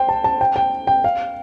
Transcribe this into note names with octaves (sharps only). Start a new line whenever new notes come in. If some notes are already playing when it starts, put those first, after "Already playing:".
Already playing: C5 G5
A5
A5
G5
G5
G5
F5